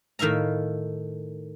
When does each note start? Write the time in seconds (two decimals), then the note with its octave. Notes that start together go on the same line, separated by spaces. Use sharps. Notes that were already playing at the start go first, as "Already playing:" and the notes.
0.19 A2 D#3 E5 F5 A#5